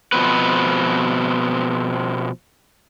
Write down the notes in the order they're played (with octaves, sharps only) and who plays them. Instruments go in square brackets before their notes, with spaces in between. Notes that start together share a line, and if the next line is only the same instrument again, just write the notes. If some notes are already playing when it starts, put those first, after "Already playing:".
[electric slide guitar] B2 F3 C4 B4